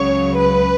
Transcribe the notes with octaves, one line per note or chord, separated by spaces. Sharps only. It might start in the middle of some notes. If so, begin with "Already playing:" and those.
Already playing: C#2 C#3 F#3 C#5
B4